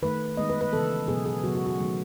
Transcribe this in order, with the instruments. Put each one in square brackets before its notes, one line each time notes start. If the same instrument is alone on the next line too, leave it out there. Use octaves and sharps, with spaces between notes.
[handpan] D#3 A3 B4
D#3 G#3 B3 D#5
B4
B4
C#3 E3 B3 A4
B2 F#3 B3 G#4
G#4
C#3 F#3 B3 F#4
F#4
F#4
D#3 F#3 A3